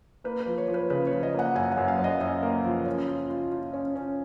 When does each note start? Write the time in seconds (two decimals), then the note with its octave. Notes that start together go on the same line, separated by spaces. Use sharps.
0.24 A#3 B4
0.40 B4
0.47 F3
0.58 C#5
0.68 F3
0.74 B4
0.90 C#3 B4
1.07 F3 C#5
1.23 D#5
1.34 A#3 F#5
1.55 F#2 G#5
1.72 F#5
1.78 F#2
1.88 F5
1.99 F#2
2.04 D#5
2.21 F#2 D#5
2.43 A#3
2.65 F3
2.86 C#4
3.08 F4
3.30 F4
3.52 F4
3.73 C#4
3.96 C#4